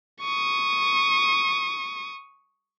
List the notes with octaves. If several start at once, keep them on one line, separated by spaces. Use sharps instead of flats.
C#6 D#6